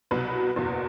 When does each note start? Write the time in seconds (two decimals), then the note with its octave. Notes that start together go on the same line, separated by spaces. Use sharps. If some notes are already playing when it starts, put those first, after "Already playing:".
0.11 C2 B2 F#3 B4
0.56 F#1 E2 B2